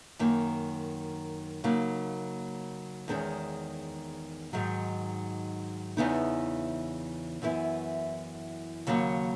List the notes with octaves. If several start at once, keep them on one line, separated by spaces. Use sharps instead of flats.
F#2 D#3 A#3
C#3 F#3 A#3 D#4
E2 D#3 G#3 C#4
G#2 D#3 F#3
E2 C#3 E3 B3 D#4
F#2 E3 B3 E4
D#2 C#3 F#3 A#3